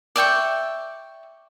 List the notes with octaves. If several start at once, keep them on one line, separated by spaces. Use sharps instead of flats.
D5 E5 G5 C#6